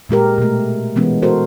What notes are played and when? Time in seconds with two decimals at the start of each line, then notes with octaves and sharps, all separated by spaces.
0.09 A#2 G#3 G4 A#4
0.38 B2 A3
0.96 E3 G#3 B3 C#4
1.22 F#4 A4 A#4 C5